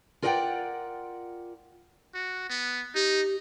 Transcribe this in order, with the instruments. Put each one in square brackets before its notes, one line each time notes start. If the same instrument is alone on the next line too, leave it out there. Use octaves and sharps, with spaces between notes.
[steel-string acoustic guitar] F4 A#4 D5 D#5 F#5 G5
[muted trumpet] F#4
B3
[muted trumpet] D#4 [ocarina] G4